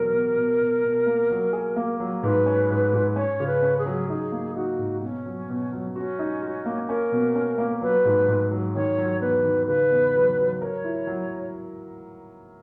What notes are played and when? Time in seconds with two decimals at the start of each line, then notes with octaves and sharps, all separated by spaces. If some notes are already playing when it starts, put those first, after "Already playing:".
Already playing: E2 B2 F#3 A#4
0.13 B2
0.37 B2
0.61 B2
0.84 B2
1.06 A#3
1.31 F#3
1.53 G#4
1.76 A#3
2.00 F#3
2.23 G#2 B4
2.46 C#4
2.70 G#2
2.93 G#2
3.16 C#4 C#5
3.40 C#3
3.47 B4
3.62 C#4
3.78 G#4
3.86 F#3
4.09 D#4 G#4
4.32 A#3
4.55 D#4 F#4
4.79 G#2
5.03 B2 C#4
5.26 F#3
5.49 B2
5.72 F#3
5.96 C#4 F#4
6.19 D#4
6.42 F#4
6.66 A#3
6.89 C#4 A#4
7.12 B2
7.36 C#4
7.58 A#3
7.81 F#3 B4
8.05 G#2
8.28 G#2
8.51 F#3
8.75 D#3 C#5
8.98 F#3
9.21 E2 B4
9.45 D#3
9.67 C#3 B4
9.91 E2
10.15 F#3
10.38 F#3
10.62 A#4 C#5
10.84 E4
11.07 F#3